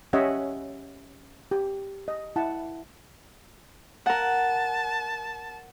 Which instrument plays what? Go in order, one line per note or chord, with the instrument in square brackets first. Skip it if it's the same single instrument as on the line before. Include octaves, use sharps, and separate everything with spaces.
[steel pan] C#4 G4 C#5 D#5 E5 F#5
G4
D#5
E4 F#5 A5
[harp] A#4 F#5 [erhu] A5